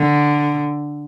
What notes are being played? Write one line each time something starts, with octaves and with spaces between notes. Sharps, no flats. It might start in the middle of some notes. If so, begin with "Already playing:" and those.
Already playing: D3